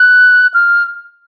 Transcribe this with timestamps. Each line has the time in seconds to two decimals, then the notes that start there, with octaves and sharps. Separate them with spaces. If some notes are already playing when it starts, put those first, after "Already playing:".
Already playing: F#6
0.54 F6